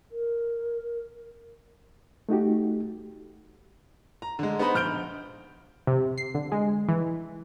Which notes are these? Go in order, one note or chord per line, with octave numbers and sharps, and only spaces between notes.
A#4
A3 D#4 F#4 G4
A#5
D3 G#3
B3 D#4 C5 D#5 B5
A#1 F6 G6 D7 G7
C3
C7
D3
G#3
E3